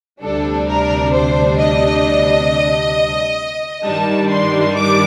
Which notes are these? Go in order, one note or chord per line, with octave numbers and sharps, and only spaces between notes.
D2 C3 G3 D4 A4
A#4
C5
D#5
G2 D#3 G3 D4 A5
C6
D6